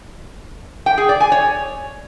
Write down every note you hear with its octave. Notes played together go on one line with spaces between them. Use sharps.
G5
G#4
D5
G#5
C#5